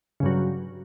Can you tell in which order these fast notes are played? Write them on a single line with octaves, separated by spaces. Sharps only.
C#3 G2 F#3